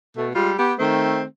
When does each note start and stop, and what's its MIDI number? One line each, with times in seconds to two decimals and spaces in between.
0.16 0.29 47
0.16 0.29 57
0.35 0.52 55
0.35 0.52 56
0.35 0.52 65
0.58 0.74 59
0.58 0.74 67
0.78 1.24 51
0.78 1.24 57
0.78 1.24 60